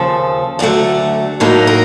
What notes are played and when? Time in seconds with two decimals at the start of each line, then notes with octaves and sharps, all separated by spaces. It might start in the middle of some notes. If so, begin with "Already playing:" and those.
Already playing: D#2 C#3 F3 A4
0.59 D2 D3 F#3 A3
1.40 A2 F#3 A#3 D#4
1.67 A#4